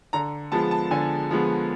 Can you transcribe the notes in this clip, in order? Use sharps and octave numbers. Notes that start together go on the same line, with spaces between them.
D3 A#5
F3 G#3 B3 A5
A5
D3 G#5
F3 G#3 B3